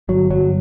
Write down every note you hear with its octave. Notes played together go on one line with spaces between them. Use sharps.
G1 F#3
G1 F#3